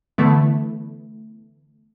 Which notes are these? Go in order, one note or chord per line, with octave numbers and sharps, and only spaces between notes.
D3 E3 A3 B3 E4